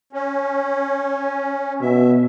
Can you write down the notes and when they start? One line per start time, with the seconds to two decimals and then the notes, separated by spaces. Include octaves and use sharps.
0.13 C#4
1.82 B2 E5